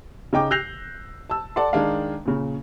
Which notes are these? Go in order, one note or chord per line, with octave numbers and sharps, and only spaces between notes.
C#3 D#4 G5 D6
E6 F#6 G6 A#6 C7 F7
A5 E6
A4 D5 F#5 A5 C6
D#3 G#3 D4 F5
A#2 C#3